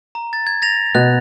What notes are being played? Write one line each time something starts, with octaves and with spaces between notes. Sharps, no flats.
A#5
A6
G#6
A6 A#6 F7
B2 F#6